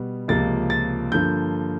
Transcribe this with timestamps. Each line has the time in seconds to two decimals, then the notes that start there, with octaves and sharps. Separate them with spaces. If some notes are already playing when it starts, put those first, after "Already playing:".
Already playing: B2 G3 B3
0.28 C#2 C3 F3 A#3 A6
0.70 A6
1.12 G2 D3 F3 A#3 G6